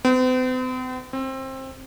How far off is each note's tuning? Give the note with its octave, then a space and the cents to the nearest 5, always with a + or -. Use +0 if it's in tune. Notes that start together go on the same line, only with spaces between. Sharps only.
C4 -45
C4 +20